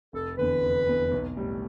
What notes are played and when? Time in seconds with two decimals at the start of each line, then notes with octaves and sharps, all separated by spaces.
0.13 F1 A4
0.38 E2 D3 B4
0.63 F1
0.87 E2 D3
1.11 B1
1.37 A2 G3